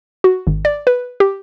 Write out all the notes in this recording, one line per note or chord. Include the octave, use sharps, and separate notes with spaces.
F#4
G#1
D5
B4
G4